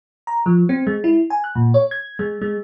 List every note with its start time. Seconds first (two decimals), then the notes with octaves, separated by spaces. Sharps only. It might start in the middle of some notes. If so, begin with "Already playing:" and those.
0.27 A#5
0.46 F3
0.69 C4
0.87 G#3
1.04 E4
1.30 G#5
1.44 F#6
1.55 A#2
1.74 C#5
1.91 G#6
2.19 G#3
2.42 G#3